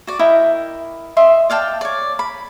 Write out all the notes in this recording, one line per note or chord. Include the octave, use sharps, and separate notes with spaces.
F#4 D5
E4 A#4 D#5 G5
D#5 E5 C6
D5 F5 G5 A5
C#5 D5
B5